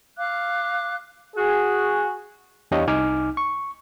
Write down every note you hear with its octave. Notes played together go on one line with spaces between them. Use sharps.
F5 D6 F#6
F#4 G#4
E2 D4 G4 C#5 D#5 F5
C2 D#4 G#5 D6 F6
C#6